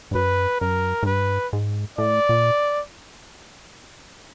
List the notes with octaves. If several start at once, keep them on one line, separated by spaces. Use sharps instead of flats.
G2
F#2 B4
F#2 A#4
G#2
G2 B4
G#2
A2 D5
A#2